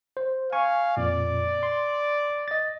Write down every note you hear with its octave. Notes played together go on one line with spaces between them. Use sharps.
C5
F5 G#5 C#6
F2 A#2 D5
C6
D#5 A6